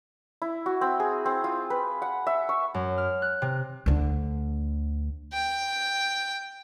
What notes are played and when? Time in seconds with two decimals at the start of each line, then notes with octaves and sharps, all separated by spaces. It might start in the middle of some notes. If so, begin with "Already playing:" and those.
0.42 E4
0.66 F#4
0.81 C4
1.00 G#4
1.25 C4
1.44 F4
1.70 B4
2.02 F#5
2.27 E5
2.49 C#6
2.74 F#2
2.98 F6
3.22 F#6
3.42 C3
3.86 D2 D3
5.33 G5